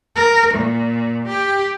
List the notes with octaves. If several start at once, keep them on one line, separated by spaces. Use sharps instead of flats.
A#4
A#2
G4